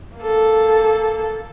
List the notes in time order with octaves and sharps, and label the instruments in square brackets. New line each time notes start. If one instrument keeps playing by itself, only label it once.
[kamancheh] A#3 A4